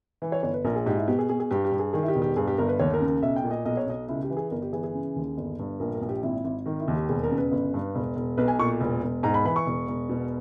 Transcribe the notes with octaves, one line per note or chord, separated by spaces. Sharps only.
E3 B4
C#5
G1 C#5
B4
A#1 A#4
G#4
G#2 G4
E4
B2 G4
G#4
B2 G#4
G#4
G2 G4
G4
G2
G#4
D#3 G#4
E4
G4
E1
G4
G2 G#4
G4
G1 A#4
B4
D#2 C#5
A#4
C#3
A#4
B1 E5
G5
A#2
D#5
B1 D#5
C#5
B1 D#5
C#2 E4
G4
E3
G#4
G1 A#4
G4
E3 G#4
G#4
C#3
D#2
G1
G2
A#1 A#4
A#4
A#1
G4
G#1 E4
G#1
D#3 A#4
E4
D#2
G4
E1 G#4
A#4
C#3
B4
G1
G2
E1
E1
B1 B4
G#5
A#2 C#6
E1
E1
G#2 A#5
B5
E3 B5
C#6
E1
E1
B2